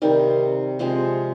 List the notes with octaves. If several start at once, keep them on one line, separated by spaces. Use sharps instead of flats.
C3 D#3 G3
C3 F3 G#3